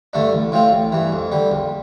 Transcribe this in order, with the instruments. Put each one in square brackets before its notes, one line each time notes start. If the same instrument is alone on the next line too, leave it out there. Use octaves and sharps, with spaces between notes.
[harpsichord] G2 D3 A3 D4
A1
A2 F3 C4 F4
A1
G2 E3
F2
D3 G3
A#1